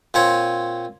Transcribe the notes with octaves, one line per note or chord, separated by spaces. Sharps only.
A#2 C4 C#5